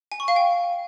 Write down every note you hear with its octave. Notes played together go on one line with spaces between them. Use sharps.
G#5
C#6
F5
G5